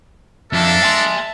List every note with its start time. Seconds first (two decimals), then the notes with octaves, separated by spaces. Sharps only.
0.53 F2 D4 A4 A#4 E5 A5
0.83 G#5 C6